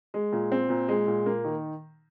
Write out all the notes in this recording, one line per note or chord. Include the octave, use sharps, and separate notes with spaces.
G#3
A#2
C4
A#2
G#3
A#2
A#3
D#3